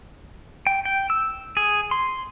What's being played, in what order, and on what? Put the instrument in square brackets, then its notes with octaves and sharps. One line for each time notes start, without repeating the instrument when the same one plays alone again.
[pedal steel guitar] G5
G5
E6
G#4
C6